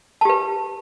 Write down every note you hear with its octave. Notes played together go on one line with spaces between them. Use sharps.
G4 B4 A5